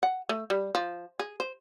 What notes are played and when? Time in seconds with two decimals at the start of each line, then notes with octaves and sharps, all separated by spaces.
0.03 F#5
0.29 A3
0.50 G3
0.75 F3
1.19 G#4
1.40 C5